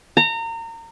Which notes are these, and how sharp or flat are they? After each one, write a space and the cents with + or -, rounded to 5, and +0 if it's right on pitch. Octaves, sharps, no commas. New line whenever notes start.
A#5 -30